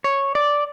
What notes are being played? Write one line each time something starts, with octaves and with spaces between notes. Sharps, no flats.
C#5
D5